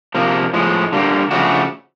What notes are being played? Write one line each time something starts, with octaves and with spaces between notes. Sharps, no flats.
C3 F3 A#3
A2 F3 G#3
D3 G3 A#3
C#3 F3 A3 D4 F#4